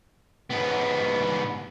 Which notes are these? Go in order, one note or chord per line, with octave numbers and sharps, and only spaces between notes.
G#2 B3